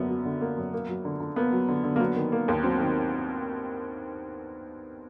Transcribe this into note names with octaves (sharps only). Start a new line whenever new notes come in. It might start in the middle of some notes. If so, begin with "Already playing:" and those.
Already playing: F#2 D3 A#3 B3
F#3
D3
A#3
F#2
A#3
F#3
D3
D3
A#3 B3
F#3
D3
D3
A#3
F#3 B3
D#3
A#3
D#2
F#3 C4
D#3